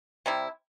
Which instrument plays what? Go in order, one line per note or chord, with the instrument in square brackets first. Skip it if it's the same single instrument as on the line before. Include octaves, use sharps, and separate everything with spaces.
[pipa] C3 G3 E4